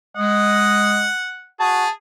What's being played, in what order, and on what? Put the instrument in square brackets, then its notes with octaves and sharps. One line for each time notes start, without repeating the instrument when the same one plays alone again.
[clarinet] G#3 [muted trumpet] D#5 [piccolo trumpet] F#5
[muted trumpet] F#4 [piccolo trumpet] G#4 [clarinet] A5